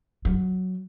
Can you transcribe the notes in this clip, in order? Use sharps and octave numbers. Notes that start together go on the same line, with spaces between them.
F#3